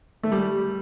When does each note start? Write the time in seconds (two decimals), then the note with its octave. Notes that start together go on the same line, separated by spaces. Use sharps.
0.23 A3
0.32 G3